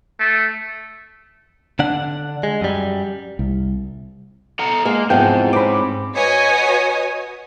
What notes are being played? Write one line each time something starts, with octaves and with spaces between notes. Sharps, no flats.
A3
D3 D4 F#5
G#3
F#2 G3
C2
A4 F#5 A#5
G#3 A#3
E2 G#2 C3 F3 G#3 F#5 G5
C4 C#4 B5 D6
F#4 B4 C#5 D#5 G#5 D#6